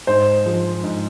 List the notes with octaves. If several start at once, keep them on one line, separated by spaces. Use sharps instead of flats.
G#2 C5
F3 G#3
G#2